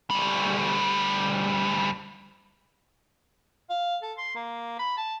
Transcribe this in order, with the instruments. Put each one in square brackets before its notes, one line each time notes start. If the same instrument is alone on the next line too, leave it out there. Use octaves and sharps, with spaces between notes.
[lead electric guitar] D2 G3
[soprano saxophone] F5
A4
C6
A#3
B5
A5